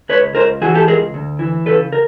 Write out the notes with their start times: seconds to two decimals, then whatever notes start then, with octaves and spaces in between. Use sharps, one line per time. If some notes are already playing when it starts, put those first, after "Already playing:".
0.09 C#2 B4 C#5
0.35 C#2 A#4 C5
0.61 E3 F#4 G#4
0.74 G4 A4
0.87 C#2 G#4 A#4
1.14 D2
1.39 E3
1.66 C#3 A4 B4
1.93 A#4